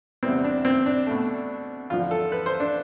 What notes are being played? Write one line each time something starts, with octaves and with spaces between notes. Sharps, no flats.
E2 C3 G3 B3 C4
D4
C4
D4
B2 A3
E2 D3 F3 F4
A4
B4
C5
D4